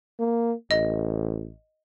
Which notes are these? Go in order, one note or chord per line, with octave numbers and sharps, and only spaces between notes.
A#3
A1 D#5